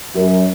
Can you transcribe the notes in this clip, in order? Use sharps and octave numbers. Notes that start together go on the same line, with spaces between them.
F#2